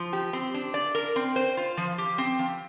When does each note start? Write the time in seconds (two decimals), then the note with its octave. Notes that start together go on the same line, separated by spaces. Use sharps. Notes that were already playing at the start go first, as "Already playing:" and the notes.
Already playing: F3
0.13 G4
0.33 C4
0.54 D4
0.74 D5
0.95 A#4
1.16 C4
1.36 C5
1.57 F4
1.77 F3
1.98 G4
2.18 C4
2.39 F3